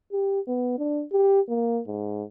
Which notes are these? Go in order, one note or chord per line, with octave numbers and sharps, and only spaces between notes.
G4
B3
D4
G4
A#3
G#2